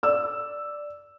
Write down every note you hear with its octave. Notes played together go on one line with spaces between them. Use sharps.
D5 E6